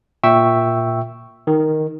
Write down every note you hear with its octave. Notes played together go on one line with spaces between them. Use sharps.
A#2 E5 G5 C#6 E6
D#3